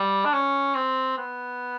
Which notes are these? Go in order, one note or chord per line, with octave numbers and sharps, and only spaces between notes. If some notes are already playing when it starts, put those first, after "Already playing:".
Already playing: G3
D4
C#4
C4
B3